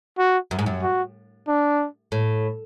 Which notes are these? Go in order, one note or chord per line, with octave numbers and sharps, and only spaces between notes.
F#4
F#2
G#2
F#2
F#4
D4
A2